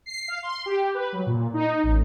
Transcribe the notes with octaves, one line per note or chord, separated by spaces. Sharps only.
C7
F5
C6
G4
B4
F#3
A#2
D#4
A1